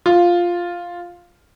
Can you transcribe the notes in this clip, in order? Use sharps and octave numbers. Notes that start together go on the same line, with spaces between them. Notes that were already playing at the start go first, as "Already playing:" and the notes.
F4